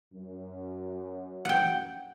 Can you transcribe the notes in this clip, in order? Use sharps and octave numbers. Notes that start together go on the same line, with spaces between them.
F#2
F#5 G5